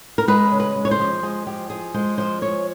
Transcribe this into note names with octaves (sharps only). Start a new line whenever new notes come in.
A#4
G#3 B4
C#3
B4
G#3
C#5
C5
F3
G#3 G#4
F3 G4
F3 G#4
G#3 C5
F3 C5
G#3 C#5